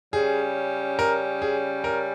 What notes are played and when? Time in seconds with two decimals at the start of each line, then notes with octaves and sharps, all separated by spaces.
0.13 C#3 G3 C#4 G#4
0.99 A#4
1.42 G#4
1.84 A#4